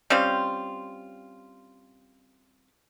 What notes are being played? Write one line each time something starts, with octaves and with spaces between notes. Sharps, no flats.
G3 C4 C#4 F4